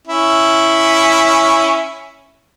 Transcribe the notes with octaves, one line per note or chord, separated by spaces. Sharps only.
C#4 E4